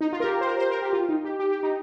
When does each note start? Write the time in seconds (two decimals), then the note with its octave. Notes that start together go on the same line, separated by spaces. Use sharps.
0.01 D#4
0.13 F4
0.20 A#4
0.24 G4
0.41 C5
0.47 A#4
0.58 C5
0.71 A#4
0.82 G4
0.93 F4
1.09 D#4
1.25 G4
1.39 G4
1.51 G4
1.63 D#4